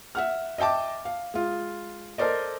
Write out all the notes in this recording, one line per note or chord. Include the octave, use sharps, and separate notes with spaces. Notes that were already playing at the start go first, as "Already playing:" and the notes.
E5 F#5 F6
D#5 E5 G5 A5 D6
F5
G#3 F4
A4 A#4 C5 D5 D#5